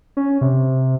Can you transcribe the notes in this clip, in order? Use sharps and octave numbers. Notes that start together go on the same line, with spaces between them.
C#4
C3